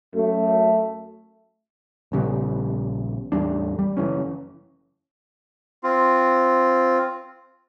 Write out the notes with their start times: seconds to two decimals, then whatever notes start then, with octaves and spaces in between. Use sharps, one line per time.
0.15 F#2 A3
2.12 A#1 C#3 G3 B3
3.32 A1 E2 G3 D4
3.79 G3
3.97 F#1 E3 C#4
5.84 C4 F4